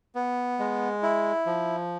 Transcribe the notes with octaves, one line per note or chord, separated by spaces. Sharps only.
B3
G#3
E4
F3